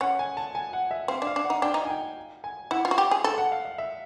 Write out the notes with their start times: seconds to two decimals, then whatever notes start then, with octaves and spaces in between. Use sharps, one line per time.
0.01 C#4 F#5
0.19 G#5
0.37 A5
0.55 G#5
0.73 F#5
0.91 E5
1.08 C4 F5
1.22 D4
1.27 F5
1.36 D4
1.44 F#5
1.50 D#4
1.62 D4 G5
1.74 D#4
1.85 G#5
1.90 G5
2.44 G#5
2.71 E4 F#5
2.85 F4
2.91 F#4
2.98 G4
3.11 G#4
3.24 A4 G5
3.38 F#5
3.52 F5
3.65 F5
3.78 E5